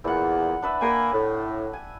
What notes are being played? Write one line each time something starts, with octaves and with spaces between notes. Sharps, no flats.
E2 A#2 E4 F#5
D4 B4 E5
A#3 B4 G5 G#5
A2
G#5